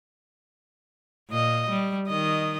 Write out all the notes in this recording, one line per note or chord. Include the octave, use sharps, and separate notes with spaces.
A#2 D#5
G3
D#3 D#5